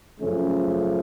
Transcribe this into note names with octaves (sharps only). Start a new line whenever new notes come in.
F#2 C#3 F3 A3 C#4